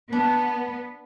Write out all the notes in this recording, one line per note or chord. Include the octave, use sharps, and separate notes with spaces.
B3 D4